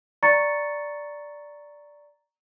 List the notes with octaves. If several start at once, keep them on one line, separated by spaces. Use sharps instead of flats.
D5 A#5 C#6 A6 C#7